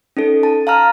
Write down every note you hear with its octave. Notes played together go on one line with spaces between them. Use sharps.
C#4 D#4 A4
A5
F5 A5 A#5 F6